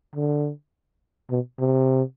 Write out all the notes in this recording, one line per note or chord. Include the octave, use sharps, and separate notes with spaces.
D3
B2
C3